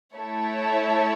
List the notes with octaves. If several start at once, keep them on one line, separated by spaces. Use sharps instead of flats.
A3 E4 A4 C#5 E5